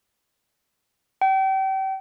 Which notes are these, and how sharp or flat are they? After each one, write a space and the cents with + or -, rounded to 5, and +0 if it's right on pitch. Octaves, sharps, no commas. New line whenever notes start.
G5 -35